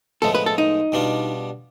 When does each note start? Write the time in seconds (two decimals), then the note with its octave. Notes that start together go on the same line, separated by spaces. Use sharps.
0.22 A2 F3 G#3 B3 A4
0.35 B4
0.46 A4
0.58 D#4
0.92 B2 G3 B3 D4 F4